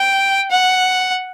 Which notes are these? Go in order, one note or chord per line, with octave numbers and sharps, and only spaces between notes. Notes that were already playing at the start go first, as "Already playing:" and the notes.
Already playing: G5
F#5